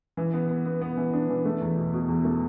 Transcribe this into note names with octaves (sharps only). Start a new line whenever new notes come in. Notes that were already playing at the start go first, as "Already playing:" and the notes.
E3
B3
B3
B3
B3
E3
D4
E3
A3
E2
B2
B2
E2
A3